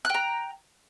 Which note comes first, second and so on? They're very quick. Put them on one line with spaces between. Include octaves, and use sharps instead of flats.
F#6 G5 A#5